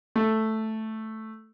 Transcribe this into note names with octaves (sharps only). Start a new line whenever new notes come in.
A3